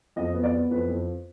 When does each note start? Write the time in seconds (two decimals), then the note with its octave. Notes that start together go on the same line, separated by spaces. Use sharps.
0.16 F2 D#5
0.34 B3
0.43 D5
0.53 B3
0.71 F2 B4
0.89 F2